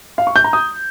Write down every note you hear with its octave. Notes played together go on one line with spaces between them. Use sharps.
F5
C#6
G6
A#5
D#6